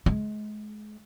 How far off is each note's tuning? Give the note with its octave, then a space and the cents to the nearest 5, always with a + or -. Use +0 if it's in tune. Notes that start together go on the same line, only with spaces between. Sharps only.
G#3 +30